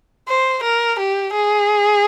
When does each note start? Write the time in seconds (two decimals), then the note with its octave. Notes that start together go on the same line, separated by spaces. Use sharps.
0.28 C5
0.63 A#4
0.99 G4
1.34 G#4